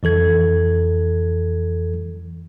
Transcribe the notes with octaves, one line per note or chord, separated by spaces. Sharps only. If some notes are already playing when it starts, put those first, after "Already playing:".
F2 E3 A4 G#6